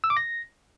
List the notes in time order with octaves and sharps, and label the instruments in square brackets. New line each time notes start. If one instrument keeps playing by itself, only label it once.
[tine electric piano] E6
D6
A#6